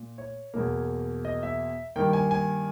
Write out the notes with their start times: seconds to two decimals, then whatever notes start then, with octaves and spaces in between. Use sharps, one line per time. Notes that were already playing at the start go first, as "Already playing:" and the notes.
Already playing: A#2
0.18 C#5
0.54 E2 B2 A#3
1.25 D#5
1.43 E5
1.96 G2 D#3 A#3 G5
2.13 G#5
2.31 G#5